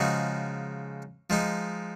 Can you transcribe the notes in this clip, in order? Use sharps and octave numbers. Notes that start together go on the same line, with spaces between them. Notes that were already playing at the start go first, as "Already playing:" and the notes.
Already playing: C#3 F3 G#3 D#4 F#4
F3 G#3 D#4